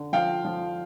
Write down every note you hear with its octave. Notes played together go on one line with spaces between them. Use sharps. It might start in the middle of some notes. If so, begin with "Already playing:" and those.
Already playing: D3
F3 F5 G5
F3